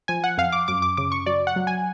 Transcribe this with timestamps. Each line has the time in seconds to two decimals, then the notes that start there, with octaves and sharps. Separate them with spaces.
0.08 F3 G#5
0.24 F#5
0.38 F2 F5
0.52 D6
0.68 F#2 D6
0.82 D6
0.97 C#3 D6
1.12 C#6
1.26 F#3 D5
1.47 F#5
1.56 F#3
1.67 G#5